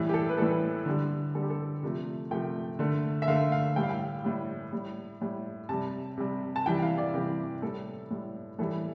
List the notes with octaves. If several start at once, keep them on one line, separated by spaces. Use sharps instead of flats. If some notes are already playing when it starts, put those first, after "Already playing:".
Already playing: A2 E3 G3
G4
A4
B4
A2 E3 G3 A4
D3 G3
D3 G3 A4
G4
A4
C3 F3 A3
C3 F3 A3 G5
D3 A3
E5
D3 A3 F5
F5
A2 G3 G5
F5
G5
A2 G3
A2 G3
A2 G3
C3 G3 A5
C3 G3
A5
C3 E3 G3 G5
F5
D5
C3 E3 G3 G4
A2 G3 A4
A2 G3
A2 E3 G3 A4